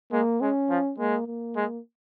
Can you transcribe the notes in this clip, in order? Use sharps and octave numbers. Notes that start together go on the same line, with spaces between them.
G#3 A#3
G#3 C#4
F3
G#3 A#3
A#3
G#3